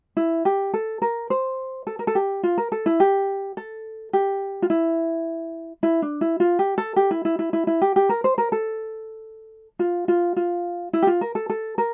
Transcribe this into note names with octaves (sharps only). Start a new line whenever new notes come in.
E4
G4
A4
A#4
C5
A4
A#4
A4
G4
F4
A#4
A4
E4
G4
A4
G4
F4
E4
E4
D4
E4
F4
G4
A4
G4
E4
E4
E4
E4
E4
G4
G4
A#4
C5
A#4
A4
F4
F4
F4
E4
G4
F4
A#4
A4
A4
A#4